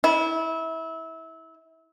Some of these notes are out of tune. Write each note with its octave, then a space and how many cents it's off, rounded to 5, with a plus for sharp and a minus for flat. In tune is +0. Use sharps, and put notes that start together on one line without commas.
E4 -25